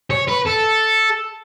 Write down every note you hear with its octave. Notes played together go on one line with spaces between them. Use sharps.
C#5
B4
A4